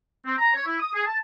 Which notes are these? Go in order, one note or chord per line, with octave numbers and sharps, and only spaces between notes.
C4
A#5
C#5
E4
D#6
G#4
A5